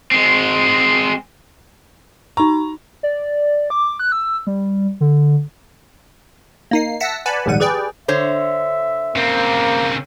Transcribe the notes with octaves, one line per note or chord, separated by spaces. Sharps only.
G#3 C4
D#4 A#5 C#6
D5
D6
F#6
E6
G3
D3
A#3 D#4 C7
E5 F#5 A5 A#6 B6 C#7
B4 D5 F#5 G#5 A5 B5
A#1 D#2 G#2 G3 F#5 D#7
G4 G#4 B4 D5 G5
D3 C5 C#5 E5
C#3 A#3 C4